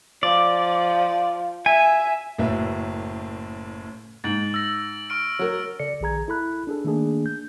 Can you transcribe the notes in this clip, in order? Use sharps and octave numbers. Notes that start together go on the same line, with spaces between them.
F3 D5
E5 G#5
F#1 F#2 A2 F#3 B4 E5
G#2 A6 D7 F#7
E6 A#6
C#6 F6 D7
F#3 A#4
C#3 A4 D5 C#7
A#1 D#3 G#4 A#5 G#6
E4 A4 B5 F#6
D4 G#4 A4
D#3 A3 A#3 D4 G#4
G6